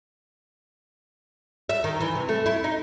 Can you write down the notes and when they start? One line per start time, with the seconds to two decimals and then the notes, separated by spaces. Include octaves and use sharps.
1.69 E5
1.84 D#3
2.01 E3
2.15 C3
2.29 A3
2.46 E4
2.64 D#4